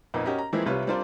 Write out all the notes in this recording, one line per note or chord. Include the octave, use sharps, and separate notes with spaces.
F2 A#2 A#3 B3 D#4
C#4 F#4 G4 A#4 D#5
A#5
E3 F3 G#3 A#3 C4 E4
C2 C3 F4 B4 C#5
G3 C4 D4 F4 A#4 C5